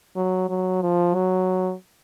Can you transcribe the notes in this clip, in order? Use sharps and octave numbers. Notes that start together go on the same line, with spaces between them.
F#3
F#3
F3
F#3